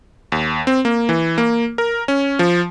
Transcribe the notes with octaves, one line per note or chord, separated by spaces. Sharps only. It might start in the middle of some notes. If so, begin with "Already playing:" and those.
D#2
C4
A#3
E3
A#3
A#4
C#4
F3